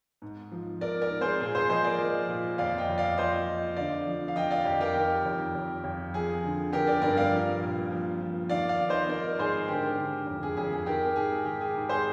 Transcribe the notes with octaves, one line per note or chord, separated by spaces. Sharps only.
G#2
F3
G#2 A#4 D5
A#4 D5
G#2
G#4 C5
A#2 G#4
G#4 C5
F3 C5 D#5
A#4 D5
F3
A#2
F2 D5 F5
D#5 G5
F2
D5 F5
F3 C5 D#5
F3
D3 D5 F5
F3
F5
F3 D#5 G5
D5 F5
F2 G4
G4 A#4
D#3
F2
F2
F2
F3 G#4
D3
D3 G4 A#4
A#4 D5
G2 A#4 D5
D5 F5
F3
A#2
F3
F3
D#3 D5 F5
D5 F5
D#3
C5 D#5
D#3 A#4 D5
G#2 G#4 C5
D3 G4 A#4
D3
F2
G#4
F2 G#4
G#4
D#3 G4 A#4
G#2 G#4
D#3 G4
G#4
G#2
G#4 C5